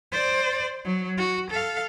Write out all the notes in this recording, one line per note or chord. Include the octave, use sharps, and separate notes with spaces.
C5 D5
F#3
F#4
A4 F5